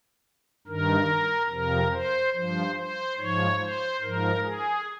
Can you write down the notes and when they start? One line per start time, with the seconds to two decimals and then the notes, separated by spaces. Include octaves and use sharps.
0.67 G2 D#3 A#4
1.50 F2 C3 F3 A#4
1.92 C5
2.34 G2 F3 C5
2.76 C5
3.18 G#2 F3 C#5
3.59 C5
4.01 G#2 F3 A#4
4.44 G#4